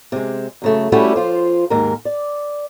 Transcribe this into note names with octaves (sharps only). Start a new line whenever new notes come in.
C3 G#3
F#2 C#3 A3
G3 A3 C#4 E4 F#4 G4
F3 F4 C5
D#2 G#2 G#3 A#4
D5